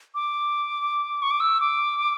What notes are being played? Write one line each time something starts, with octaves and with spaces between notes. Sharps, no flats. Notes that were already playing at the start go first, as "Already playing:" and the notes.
D6
C#6
D6
E6
D6